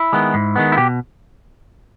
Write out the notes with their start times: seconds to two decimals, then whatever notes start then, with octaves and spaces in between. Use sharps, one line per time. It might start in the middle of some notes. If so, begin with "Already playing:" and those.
Already playing: E4
0.13 D#3 G#3 B3
0.34 G#2
0.56 D#3 G#3 B3
0.72 E4
0.77 B2 G4